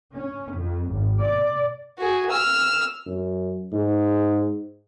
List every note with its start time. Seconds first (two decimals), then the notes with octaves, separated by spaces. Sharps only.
0.15 C#4
0.55 F2
0.92 G#1
1.23 D5
1.99 F#4 G#4
2.30 E6 F6
3.06 F#2
3.73 G#2